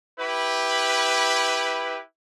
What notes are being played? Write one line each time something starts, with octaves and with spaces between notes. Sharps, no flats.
E4 G4 B4